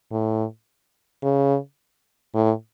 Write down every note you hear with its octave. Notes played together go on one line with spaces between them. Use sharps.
A2
C#3
A2